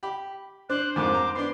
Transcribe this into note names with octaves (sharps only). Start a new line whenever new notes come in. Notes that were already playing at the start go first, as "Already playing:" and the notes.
G4 B5
D4 C5 F#6
F2 G#2 D#3 D6
A#5
B3 D4 C6